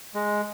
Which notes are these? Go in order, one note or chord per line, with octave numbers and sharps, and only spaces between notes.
G#3